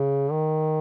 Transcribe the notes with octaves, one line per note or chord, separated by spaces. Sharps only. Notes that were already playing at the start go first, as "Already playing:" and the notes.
Already playing: C#3
D#3